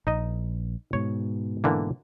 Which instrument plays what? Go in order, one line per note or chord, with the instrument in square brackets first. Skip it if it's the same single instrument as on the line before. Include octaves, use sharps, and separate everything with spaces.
[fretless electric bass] A#1 [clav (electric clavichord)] D#4 D#5
[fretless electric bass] G#2 B2 [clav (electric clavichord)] C#5
[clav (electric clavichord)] D3 E3 A#3